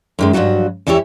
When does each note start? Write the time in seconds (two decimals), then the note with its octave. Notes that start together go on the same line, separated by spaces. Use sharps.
0.19 F#2 D#3 G#3
0.33 G2 A#2 F3 F#3 F#4
0.87 E2 E3 E4 G4 C#5